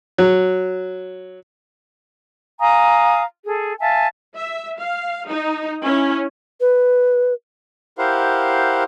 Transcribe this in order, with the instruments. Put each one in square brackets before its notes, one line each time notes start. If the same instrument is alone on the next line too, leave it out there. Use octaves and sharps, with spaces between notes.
[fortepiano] F#3
[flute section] F5 G#5 A#5 D#6
G#4 A4
E5 F5 G#5 A5
[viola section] E5
F5
D#4
C#4 E4
[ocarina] B4
[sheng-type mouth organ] E4 G4 A#4 C5 F5 F#5